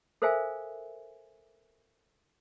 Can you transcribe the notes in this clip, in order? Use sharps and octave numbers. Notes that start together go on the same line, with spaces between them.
A4 A#4 C5 E5 F5 G#5